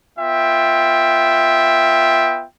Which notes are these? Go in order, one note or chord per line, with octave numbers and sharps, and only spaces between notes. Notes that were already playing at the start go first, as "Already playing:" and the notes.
B3 F4 E5 G5